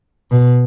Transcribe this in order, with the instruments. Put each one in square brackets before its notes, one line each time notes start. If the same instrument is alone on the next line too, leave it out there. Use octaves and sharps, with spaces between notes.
[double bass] B2